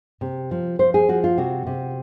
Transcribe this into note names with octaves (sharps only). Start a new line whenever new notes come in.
C3
F3
F3 C5
G#4
F3 F#4
F4
C3 F#4
C3